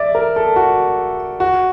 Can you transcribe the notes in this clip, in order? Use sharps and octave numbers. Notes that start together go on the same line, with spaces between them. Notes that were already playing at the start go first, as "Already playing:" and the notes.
Already playing: D5 E5
A#4
A4
F#4
F#4